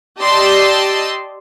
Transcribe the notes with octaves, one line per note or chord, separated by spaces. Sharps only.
G4 D5 D#5 A5 C6 E6